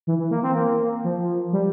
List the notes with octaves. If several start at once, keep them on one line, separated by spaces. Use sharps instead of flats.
E3
E3
A#3
C4
A#3
F3
G3